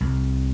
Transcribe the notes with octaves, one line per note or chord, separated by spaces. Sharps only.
C2